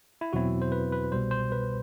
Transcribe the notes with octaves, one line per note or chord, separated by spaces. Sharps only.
E4
E2 B2 F#3 C4 E4 F#4
C5
B4
B4
C2 B2 G3 C5
C5
B4